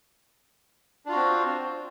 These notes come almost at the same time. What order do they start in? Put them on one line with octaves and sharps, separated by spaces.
D4 F4 F#4 C4